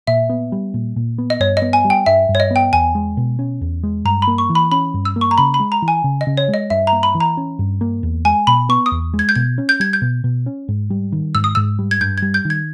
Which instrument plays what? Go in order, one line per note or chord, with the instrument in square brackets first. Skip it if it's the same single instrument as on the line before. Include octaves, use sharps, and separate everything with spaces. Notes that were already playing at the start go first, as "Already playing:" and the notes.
[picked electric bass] A#2 [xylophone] E5
[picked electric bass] B3
G3
A#2
A#2
B3
[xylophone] D#5
[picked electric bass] G2 [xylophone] C#5
[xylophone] D#5
[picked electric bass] B3
[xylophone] G#5
[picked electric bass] G3
[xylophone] G5
[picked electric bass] G2 [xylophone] E5
[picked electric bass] G2
[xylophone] C#5
D#5
[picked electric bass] B3
[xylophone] G5
[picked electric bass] E2 [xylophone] G#5
[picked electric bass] G#3
B2
C#4
E2
G#3
[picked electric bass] G2 [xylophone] A#5
[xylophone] B5
[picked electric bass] A#3
[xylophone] C#6
[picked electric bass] E3
[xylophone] B5
[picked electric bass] C#4 [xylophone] B5
[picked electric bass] G2
[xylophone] E6
[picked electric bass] A#3
[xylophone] C#6
A#5
[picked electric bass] C#3 [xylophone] B5
[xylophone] B5
[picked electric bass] G#3
[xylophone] A#5
[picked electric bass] E3
[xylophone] G#5
[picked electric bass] C#3
[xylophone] D#5
[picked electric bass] C#3
[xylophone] C#5
[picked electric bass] G#3
[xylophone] D#5
[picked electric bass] G2 [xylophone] E5
[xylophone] A#5
[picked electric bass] A#3
[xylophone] B5
[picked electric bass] E3
[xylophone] A#5
[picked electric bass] C#4
G2
A#3
E2
[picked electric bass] G#3 [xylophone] G#5
[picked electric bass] B2 [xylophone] B5
[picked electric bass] B3 [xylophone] C#6
[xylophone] D#6
[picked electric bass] E2
G#3
[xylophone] G#6
G6
[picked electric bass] B2 [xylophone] G#6
[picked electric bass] C#4
[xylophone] G6
[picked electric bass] G3 [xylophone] G#6
[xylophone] G6
[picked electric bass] B2
B2
C#4
G#2
G3
D#3
[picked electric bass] G#2 [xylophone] E6
[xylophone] D#6
[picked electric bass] G#2 [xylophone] E6
[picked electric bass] G3
[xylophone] G#6
[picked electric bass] G2 [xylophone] G6
[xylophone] G#6
[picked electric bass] G3
[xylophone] G6
[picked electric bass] D#3
[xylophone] G#6